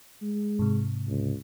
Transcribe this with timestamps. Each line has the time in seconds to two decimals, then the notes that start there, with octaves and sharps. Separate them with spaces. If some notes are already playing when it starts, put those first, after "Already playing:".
0.22 G#3
0.59 G#2 C3
1.08 C#2